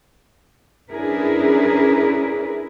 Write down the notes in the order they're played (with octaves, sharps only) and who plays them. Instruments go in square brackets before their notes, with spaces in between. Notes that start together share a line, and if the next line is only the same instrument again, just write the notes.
[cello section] C#4 D4 E4 G#4 A#4 B4